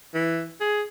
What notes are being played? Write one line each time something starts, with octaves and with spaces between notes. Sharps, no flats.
E3
G#4